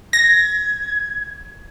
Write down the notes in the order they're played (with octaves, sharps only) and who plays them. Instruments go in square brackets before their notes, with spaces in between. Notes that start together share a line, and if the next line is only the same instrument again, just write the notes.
[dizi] G#6 [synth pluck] A#6